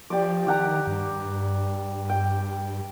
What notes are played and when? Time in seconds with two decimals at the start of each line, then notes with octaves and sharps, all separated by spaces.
0.10 F3 G4 D5
0.47 D#3 G4 F#5 A#5
0.87 G2
2.09 G5